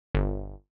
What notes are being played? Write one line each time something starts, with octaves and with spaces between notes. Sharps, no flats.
G1